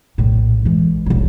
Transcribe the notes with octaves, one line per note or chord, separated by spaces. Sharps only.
A#1 A2
E3 G#3
D#1 A#1